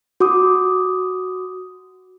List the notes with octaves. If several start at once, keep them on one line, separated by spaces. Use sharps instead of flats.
F#4 D6 D#6